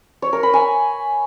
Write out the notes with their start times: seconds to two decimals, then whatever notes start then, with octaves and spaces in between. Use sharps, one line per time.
0.22 C#5
0.33 A#4
0.43 B5
0.54 G#5